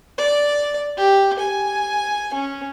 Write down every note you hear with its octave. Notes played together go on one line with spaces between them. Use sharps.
D5
G4
G#5
C#4